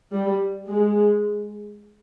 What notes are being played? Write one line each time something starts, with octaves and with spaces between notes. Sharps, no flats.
G3
G#3